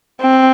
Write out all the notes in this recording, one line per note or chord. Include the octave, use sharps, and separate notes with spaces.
C4